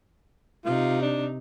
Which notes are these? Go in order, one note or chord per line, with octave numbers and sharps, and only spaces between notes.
C3 D#4 F4
D4